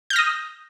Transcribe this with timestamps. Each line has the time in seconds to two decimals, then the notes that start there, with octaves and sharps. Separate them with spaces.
0.10 G6
0.13 F6
0.16 A#6
0.19 D#6